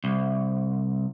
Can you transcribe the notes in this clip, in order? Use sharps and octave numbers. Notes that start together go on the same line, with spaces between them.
C2